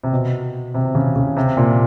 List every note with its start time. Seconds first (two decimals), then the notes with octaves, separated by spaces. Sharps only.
0.04 C3
0.12 B2
0.74 C3
0.95 C#3
1.16 C#3
1.37 C3
1.57 A#2